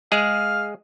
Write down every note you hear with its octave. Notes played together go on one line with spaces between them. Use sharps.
G#3 G#4 F5